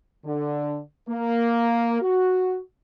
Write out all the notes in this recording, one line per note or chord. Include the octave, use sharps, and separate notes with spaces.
D3
A#3
F#4